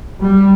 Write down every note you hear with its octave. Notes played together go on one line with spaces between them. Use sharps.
G3